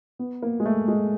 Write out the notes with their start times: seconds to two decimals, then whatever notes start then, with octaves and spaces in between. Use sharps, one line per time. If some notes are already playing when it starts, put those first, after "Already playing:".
0.19 B3
0.42 A#3
0.60 G#3
0.65 A3
0.88 G#3